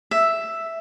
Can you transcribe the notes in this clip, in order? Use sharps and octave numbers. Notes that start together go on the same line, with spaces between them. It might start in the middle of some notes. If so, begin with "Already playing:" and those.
E5